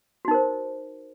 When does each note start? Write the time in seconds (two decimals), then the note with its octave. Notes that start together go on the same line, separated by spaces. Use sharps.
0.25 F#4
0.28 D#4
0.31 A#4
0.34 C5